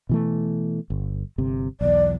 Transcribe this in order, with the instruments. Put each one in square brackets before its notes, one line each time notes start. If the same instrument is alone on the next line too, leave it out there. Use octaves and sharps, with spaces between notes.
[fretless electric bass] B2 E3 A3
G1
G1 C3
[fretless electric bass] B1 E2 [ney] D5